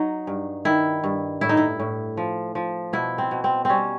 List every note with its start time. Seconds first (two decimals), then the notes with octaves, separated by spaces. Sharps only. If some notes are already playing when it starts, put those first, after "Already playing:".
Already playing: F#3 D#4
0.27 G2
0.65 D#3 E4
1.04 G2
1.41 A2 E4
1.49 D#4
1.57 E4
1.80 A2
2.17 F3
2.55 F3
2.93 B2 E4
3.18 C4
3.31 B2
3.44 C4
3.65 G3 C4 C#4